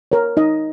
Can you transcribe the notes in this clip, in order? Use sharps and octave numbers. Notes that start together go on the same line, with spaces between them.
A#4 C#5
D#4 D#5